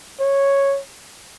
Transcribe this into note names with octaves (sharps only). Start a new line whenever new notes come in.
C#5